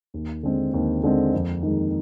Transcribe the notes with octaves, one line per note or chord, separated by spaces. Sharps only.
D#2
D3 G#3 C4
D#2
D3 G#3 C4
F2
D#3 G#3